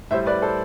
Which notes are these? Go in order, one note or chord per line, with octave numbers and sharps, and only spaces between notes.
A2 G3 C5 E5
B4 D5
A4 C5